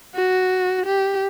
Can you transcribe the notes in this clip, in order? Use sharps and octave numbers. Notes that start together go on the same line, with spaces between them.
F#4
G4